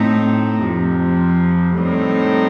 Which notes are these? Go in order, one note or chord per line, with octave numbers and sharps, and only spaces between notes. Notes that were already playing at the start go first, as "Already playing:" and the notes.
Already playing: A2 A3 C4 D#4
F2 C3 F3
A2 G3 C4 D#4